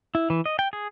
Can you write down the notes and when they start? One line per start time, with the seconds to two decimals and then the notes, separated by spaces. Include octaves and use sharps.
0.15 E4
0.30 E3
0.46 D#5
0.59 G5
0.73 G#4